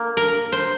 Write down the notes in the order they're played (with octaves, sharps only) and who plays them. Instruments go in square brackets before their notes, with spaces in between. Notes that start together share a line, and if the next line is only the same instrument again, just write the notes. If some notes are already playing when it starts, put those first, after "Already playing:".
Already playing: [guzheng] A#3
A#4
C5